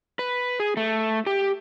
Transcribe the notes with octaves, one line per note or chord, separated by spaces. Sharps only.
B4
G#4
A3
G4